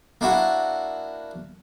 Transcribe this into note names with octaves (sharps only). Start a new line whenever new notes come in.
A#3 D4 E4 F#4